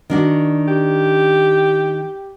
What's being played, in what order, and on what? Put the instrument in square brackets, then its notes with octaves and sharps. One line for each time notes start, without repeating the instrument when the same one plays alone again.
[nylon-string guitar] D#3 D4 F#4
[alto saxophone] G4